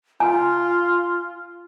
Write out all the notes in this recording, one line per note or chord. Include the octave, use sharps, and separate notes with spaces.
F4 G#5